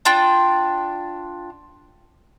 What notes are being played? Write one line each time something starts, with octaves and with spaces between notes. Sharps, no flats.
D4 F4 G5